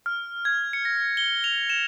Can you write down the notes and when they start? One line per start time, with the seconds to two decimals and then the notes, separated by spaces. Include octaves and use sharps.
0.06 F6
0.45 G#6
0.73 C#7
0.85 A#6
1.17 G7
1.44 F7
1.70 E7